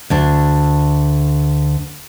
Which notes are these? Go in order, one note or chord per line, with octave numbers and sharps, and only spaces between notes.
D2 D4